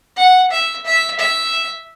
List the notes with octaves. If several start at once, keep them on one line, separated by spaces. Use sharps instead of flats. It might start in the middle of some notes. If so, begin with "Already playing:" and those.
F#5
E5
E5
E5